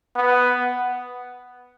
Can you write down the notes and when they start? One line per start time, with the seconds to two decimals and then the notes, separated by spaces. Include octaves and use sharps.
0.16 B3